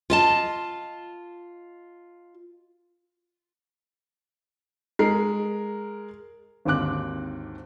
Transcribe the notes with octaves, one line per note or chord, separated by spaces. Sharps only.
F4 D#5 A5
G#3 A#4 C7
G#1 D#2 D3 C4 D6 F#6